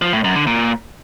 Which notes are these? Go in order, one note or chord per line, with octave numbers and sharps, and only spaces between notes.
F3
A2
F#2
D3
A#2